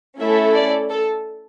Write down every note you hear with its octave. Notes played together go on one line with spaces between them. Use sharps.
A3 C#4 E4 A4 E5
D5
A4